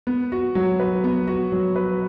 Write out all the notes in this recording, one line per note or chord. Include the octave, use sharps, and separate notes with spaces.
B3
F#4
F#3
B4
B3
F#4
F#3
B4